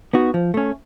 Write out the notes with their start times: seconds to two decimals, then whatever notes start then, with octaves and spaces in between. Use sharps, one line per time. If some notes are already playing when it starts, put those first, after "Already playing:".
0.13 B3 D#4 F#4
0.34 F3
0.54 A3 C#4